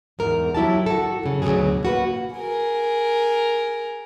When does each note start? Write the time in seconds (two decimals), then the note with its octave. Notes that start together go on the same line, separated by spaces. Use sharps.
0.19 E2 G#2 A#4
0.55 F#3 E4 G4 A5
0.86 F#4 A4
1.23 F#2 C#3
1.42 D2 G#2 B2 F#3 G#4
1.83 A#3 F#4 B4
2.35 G#4 A#4